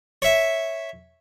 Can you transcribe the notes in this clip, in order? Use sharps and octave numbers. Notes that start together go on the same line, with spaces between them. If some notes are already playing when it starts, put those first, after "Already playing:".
C#5 E5